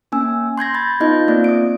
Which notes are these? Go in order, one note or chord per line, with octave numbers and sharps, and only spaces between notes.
A#3 C#4 G#5 E6
C6 G6 G#6 A#6
B5 G6 A6
B3 D#4 F4 D#5 G6
A#3 C4 F4 D5
D#6 D7